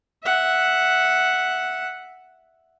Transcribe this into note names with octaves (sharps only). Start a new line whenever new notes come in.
E5 F#5